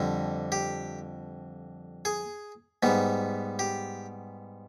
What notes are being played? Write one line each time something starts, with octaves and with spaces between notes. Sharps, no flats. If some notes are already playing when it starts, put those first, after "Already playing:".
Already playing: F2 D3 G3
G4
G#4
G#2 G3 B3
G4